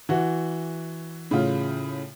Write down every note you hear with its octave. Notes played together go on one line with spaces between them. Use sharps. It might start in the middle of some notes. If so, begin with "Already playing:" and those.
E3 F#4
A2 C#3 F4